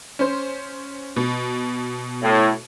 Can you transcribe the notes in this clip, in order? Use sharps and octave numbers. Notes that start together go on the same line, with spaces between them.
C#4 C5
B2
A2